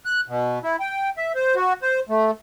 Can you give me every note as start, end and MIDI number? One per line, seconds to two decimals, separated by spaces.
0.05 0.21 90
0.28 0.59 47
0.63 0.76 64
0.80 1.10 79
1.17 1.32 76
1.35 1.55 72
1.56 1.73 66
1.82 2.00 72
2.09 2.31 57